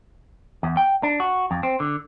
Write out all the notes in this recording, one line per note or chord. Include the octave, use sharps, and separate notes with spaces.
E2
G5
D4
F#4
F2
C4
D3